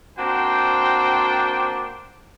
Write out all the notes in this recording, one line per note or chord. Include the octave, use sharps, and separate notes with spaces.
A#3 C4 D4 F#4 C5 G5